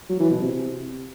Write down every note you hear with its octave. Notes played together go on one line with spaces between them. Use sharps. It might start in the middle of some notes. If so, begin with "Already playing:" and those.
F#3
E3
B2
C3